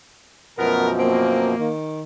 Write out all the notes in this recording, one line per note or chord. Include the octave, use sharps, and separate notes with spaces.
F#2 B2 F3 A3 B3 A#4
A#3 C4
D#3